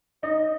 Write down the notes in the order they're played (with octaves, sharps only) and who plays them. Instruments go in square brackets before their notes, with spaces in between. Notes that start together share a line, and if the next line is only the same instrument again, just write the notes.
[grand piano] D#4 [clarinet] D#5